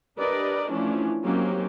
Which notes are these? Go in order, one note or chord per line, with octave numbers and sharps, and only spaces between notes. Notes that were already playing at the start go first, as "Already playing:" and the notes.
D4 G4 A#4 B4 D5 D#5
E3 F3 A3 C#4 D4 E4
F#3 A#3 C4 C#4 D#4 G4